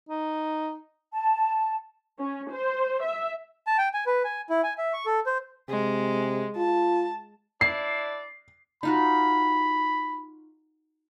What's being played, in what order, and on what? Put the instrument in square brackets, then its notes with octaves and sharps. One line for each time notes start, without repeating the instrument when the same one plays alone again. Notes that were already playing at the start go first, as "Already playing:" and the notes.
[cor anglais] D#4
[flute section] A5
[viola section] C#4
C5
E5
[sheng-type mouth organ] A5
G5
G#5
B4
G#5
E4
G#5
E5
C#6
A4
C5
[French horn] C3 [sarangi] G#3
[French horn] F4 [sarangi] A5
[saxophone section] D4 E4 D5 [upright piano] C7
[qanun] D#4 F4 F#4 [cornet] B5